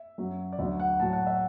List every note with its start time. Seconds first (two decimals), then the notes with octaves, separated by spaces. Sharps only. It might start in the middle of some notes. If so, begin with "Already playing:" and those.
Already playing: E5
0.18 F#2 F#3
0.53 D5
0.59 D2 D3 F#3 E5
0.80 F#5
1.00 A2 F#3 A5
1.13 F#5
1.27 E5